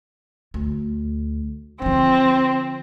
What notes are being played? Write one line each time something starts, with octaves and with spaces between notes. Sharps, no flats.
D2
D3 F3 C4